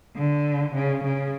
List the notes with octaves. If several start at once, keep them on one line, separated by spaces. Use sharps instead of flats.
D3
C#3
C#3